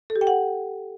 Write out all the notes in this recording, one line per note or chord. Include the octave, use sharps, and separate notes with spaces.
A4
G4
G5
F#5